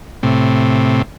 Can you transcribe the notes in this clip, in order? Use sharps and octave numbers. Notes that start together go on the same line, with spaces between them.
A2 C3